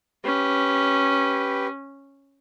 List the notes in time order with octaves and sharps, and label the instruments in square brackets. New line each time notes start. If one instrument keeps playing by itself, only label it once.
[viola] C#4 [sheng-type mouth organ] G4 B4